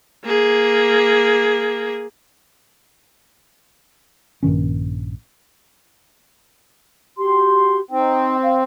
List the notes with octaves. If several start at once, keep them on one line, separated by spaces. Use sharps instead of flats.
A#3 G#4
A#1 G2 D#3 C#4
F#4 G4 C6
C4 D#4 G5
F5